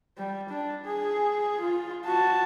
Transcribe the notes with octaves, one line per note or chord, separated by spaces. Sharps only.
G3
D4
G#4
F4
F#4 A5